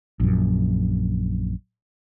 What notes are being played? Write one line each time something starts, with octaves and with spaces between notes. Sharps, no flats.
A#1 F#2